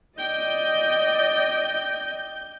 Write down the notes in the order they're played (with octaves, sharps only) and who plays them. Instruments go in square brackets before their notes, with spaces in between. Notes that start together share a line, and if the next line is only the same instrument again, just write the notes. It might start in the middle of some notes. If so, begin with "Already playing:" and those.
[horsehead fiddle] D5 D#5 [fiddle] G5 [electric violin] G6